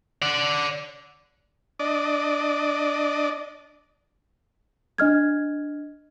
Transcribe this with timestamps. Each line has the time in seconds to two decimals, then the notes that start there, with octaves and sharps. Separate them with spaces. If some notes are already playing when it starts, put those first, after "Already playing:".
0.22 D5 F#5
1.79 D4 D5 D#5
4.98 D4 D#5 F6 G#6